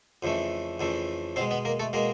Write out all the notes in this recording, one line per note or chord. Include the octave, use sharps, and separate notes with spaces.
F2 C#3 E3 A3
F2 C#3 E3 A3
B2 G#3 C4 C5
B3 B4
A#3 A#4
A3 A4
B2 G#3 A#3 A#4